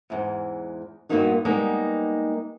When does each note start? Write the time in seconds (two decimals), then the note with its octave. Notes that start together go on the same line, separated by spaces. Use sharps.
0.10 E2 G#2
1.09 G2 A#2 A#3 B3 D#4 F#4
1.45 G3 G#3 A#3 B3 D#4